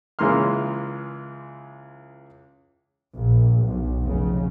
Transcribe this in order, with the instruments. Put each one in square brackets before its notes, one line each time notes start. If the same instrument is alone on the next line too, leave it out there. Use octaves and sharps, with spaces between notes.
[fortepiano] C#2 E3 G#3 A#3 C6 F6
[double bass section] A#1
B1
F1 C#3